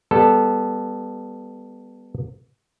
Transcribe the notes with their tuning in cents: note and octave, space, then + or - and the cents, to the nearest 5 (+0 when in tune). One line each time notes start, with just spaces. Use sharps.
G3 +30 B3 +0 A4 +0